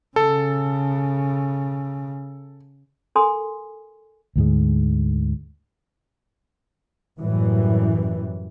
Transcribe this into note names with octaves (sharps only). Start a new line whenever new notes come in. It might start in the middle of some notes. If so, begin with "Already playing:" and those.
C#3 A4
A4 A#4 G#5 C6 D#6
D2 G#2 G#3
F#2 A2 E3 G3